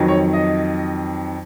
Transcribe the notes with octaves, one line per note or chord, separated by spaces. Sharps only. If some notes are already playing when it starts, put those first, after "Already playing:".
Already playing: F2 D#3 F#3
C#5
D#5